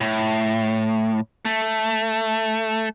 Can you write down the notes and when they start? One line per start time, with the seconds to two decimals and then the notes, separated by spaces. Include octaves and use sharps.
0.01 A2
1.45 A3